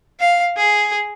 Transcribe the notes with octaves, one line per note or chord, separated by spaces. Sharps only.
F5
G#4